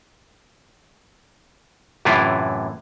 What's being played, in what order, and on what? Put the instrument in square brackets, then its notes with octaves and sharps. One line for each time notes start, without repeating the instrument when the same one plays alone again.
[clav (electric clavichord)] F#2 A2 C3 E3 E4 F4